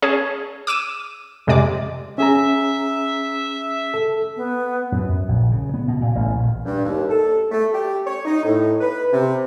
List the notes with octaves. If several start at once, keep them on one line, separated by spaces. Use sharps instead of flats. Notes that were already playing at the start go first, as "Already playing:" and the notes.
C#4 G#4 C#5 A5
D6 E6 D#7 E7
F2 C3 G#3 D5 D6
C#4 G#4 E5 A#5
A4
B3
F#2
F#2
A#1
C#3
B3
B2
A#2
A1
A#1
G2
D#2
A4
A3
G4
C#5
D#4
A2
B4
C3